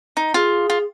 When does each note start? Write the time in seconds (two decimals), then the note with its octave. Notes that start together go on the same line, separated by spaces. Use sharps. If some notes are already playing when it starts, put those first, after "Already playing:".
0.17 D#4
0.34 F4 G#4
0.70 F4